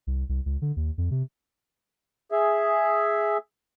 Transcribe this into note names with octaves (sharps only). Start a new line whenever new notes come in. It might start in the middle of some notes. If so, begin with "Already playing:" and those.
C2
C2
C#2
D3
D#2
F2
C3
G#4 E5